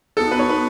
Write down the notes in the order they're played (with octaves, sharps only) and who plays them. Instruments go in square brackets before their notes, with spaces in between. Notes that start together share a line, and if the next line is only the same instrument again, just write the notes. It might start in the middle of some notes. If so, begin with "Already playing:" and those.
[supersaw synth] F#3 B3 D#4 [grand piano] A4
[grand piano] B4
C#5
B4